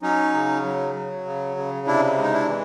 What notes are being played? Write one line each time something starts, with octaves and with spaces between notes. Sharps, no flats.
F#3 C#4 D#4
C#3
F#3
F#3
C#3
C#3
C3 D4 E4
G#3
D#4
D4 E4
E3